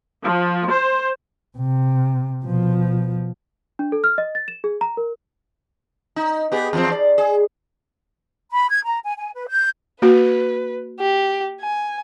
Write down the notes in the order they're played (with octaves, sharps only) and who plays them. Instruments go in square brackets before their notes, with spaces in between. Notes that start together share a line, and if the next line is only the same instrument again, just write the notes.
[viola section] F3
C5
[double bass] C3
B2 F3
[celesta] D4
A4
F6
D#5
A6
E7
G#4
A#5
A#4
[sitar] D#4
B3 G4 G#4
E2 F3 C4
D5
G#4
[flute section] B5
G#6
A#5
G#5
G#5
B4
G6
[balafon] A#3 F#4 [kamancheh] B4
[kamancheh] G4
G#5